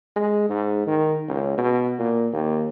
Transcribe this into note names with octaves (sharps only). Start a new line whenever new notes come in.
G#3
G#2
D#3
C#2
B2
A#2
D#2